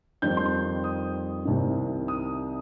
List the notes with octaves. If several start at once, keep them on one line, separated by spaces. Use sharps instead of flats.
F2 D#3 G3 C4 G6
C6
D#6
C2 C3 D#3
D#6